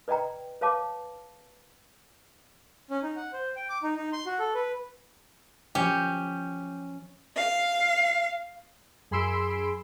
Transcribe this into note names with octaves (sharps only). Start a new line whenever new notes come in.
B4 D5 D#5 G5 A#5
B4 C#5 F5 A5 D6
C#4
D#4
F#5
C5
G5
D6
D#4
D#4
C6
F#4
A4
B4
F3 F#3 C#4 F#4 G4
F5
F#2 G#4 B5 C6 E6 D7